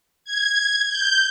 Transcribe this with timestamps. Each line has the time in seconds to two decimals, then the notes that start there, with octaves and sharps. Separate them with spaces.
0.25 G#6
0.88 G6